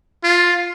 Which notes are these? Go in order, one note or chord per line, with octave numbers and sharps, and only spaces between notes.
F4